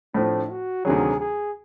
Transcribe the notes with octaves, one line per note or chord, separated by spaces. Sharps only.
A2 F3 A3 C4 D4
F#4
D2 C3 D#3 F#3 G#4
G#4